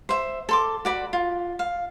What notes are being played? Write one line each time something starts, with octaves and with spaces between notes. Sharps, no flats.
C5 E5
A4 C6 D6
F#4 D5 B5
F4
F5